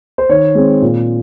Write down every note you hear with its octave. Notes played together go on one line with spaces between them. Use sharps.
C5
D#3 C#5
G#3 C4
A#2